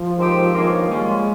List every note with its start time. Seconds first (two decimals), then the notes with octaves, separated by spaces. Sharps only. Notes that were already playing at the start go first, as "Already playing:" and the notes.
Already playing: F3
0.16 D#3 G#3 C4 G4
0.52 G2 D#3 A#3 C#4 F4
0.88 G3 G#3 A#3 C#4 F4